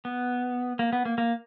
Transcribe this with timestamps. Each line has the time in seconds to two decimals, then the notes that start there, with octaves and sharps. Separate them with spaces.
0.05 B3
0.79 A#3
0.93 B3
1.05 A#3
1.18 A#3